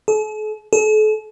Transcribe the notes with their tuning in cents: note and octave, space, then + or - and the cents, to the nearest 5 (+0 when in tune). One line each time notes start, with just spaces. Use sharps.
A4 -45
A4 -40